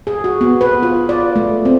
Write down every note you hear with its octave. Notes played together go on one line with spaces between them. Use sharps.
G#4
F#4
B3
B4
F4
D5
A3
C4